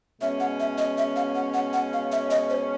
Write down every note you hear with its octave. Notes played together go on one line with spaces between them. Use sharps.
B2 G#3 C#4 E5
F#5
E5
D#5
E5
F5
F#5
F#5
F#5
F5
E5
D#5
C5